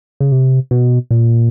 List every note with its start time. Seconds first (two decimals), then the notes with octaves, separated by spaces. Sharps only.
0.20 C#3
0.32 C3
0.71 B2
1.11 A#2